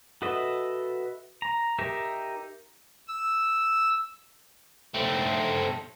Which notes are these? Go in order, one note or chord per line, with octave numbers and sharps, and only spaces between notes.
F#4 A4 B4 D#5 E5
A#5
D#4 G4 A#4 E5
E6
A3 C4